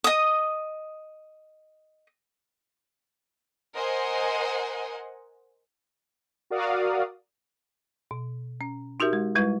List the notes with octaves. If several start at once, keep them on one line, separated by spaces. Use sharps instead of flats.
D#5 D#6
A#4 C5 D#5 F#5 G#5
F#4 A#4 D5 F5 D#6
B2
C#4
D#4 F#4 G4 A#4 E5
G#3
G3 G#3 E4 B4